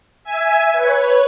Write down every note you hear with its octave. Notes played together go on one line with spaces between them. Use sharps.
E5 G#5
B4 C#5